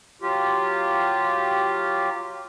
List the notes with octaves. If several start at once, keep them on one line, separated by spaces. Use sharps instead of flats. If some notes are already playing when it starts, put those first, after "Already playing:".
F#3 F4 G4